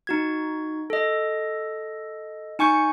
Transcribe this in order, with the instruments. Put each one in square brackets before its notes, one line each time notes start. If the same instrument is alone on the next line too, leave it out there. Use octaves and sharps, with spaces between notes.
[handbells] D#4 F#4 G#6
A4 D#5
D#4 G#5 C#6 G6 C#7